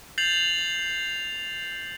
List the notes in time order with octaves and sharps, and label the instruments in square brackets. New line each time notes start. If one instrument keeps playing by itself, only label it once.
[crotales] G6 A6 C7 F7 F#7